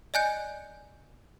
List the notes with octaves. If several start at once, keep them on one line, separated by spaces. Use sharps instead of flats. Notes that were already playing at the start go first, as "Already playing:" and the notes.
D5 D#5 G#5 F#6 G6 C#7